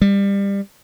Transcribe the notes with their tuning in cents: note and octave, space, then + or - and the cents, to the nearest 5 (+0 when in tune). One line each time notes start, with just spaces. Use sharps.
G3 +25